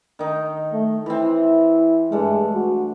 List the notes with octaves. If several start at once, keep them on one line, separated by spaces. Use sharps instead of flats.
D#3 D#4
A3
E3 C4 E4
G2 G#3 A3
F#4